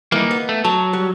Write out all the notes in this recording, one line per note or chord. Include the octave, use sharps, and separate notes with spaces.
E3 G3 A#3 D#4 B4
B3
A3
F#3 A5
G3 F#4